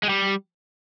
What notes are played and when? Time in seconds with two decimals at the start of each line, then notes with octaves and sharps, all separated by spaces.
0.03 G#3
0.09 G3